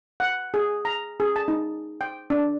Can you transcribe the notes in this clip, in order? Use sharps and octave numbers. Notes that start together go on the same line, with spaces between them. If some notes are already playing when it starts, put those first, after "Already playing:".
F#5
G#4
A#5
G#4
A5
D#4
G5
D4